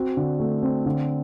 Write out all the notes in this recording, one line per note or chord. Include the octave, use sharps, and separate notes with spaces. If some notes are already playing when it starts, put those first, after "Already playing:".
Already playing: C4 F#4
D3
A3
C4
D3